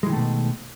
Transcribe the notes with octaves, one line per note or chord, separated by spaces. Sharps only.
B2 D#3 E3 G#3 A3